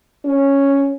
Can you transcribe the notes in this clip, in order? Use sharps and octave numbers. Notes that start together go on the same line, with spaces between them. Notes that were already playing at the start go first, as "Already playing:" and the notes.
C#4